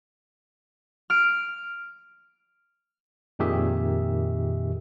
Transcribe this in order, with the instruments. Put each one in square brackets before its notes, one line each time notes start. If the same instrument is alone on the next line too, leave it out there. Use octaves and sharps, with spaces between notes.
[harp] F6 D7
[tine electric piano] F2 A#2 D#3 G4 G#4 E5